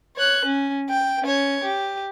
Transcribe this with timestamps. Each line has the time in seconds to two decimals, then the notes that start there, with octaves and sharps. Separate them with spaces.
0.16 C#5 F#6
0.45 C#4
0.89 G5
1.22 C#4 C#5
1.64 G4